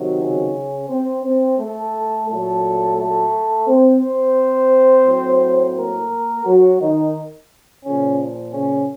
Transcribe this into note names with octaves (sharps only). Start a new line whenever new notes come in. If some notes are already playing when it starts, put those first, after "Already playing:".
Already playing: C3 D#3 F#3
C#3 C#4
C4 C5
C4 C5
A3 A4
A#2 F#3 A3 A4
A3 A4
C4 C5
C4 C5
A2 F#3
A#3 A#4
F#3 F#4
D#3 D#4
A#2 C#3 F3 C#4
C#3 C#4